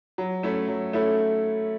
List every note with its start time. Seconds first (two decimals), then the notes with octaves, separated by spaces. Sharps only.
0.18 F#3
0.43 A3 C#4 E4 A4
0.68 F#3
0.93 A3 C#4 E4 A4